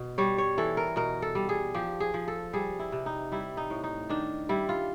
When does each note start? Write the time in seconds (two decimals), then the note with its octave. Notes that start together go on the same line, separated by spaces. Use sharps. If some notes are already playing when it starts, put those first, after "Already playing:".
Already playing: B2
0.18 G3 C#5
0.38 C#5
0.58 E3 A4
0.77 A#4
0.96 B2 A#4
1.22 A4
1.35 G3
1.49 G#4
1.74 F3 G4
2.00 G#4
2.14 F3
2.28 A4
2.53 G3 G#4
2.79 E4
2.92 C3
3.06 D#4
3.32 G3 E4
3.57 D#4
3.70 A2
3.84 D#4
4.09 D#3 D4
4.49 G3 E4
4.69 F4